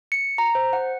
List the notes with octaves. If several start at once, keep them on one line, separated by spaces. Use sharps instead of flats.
C#7
A#5
C5
F#5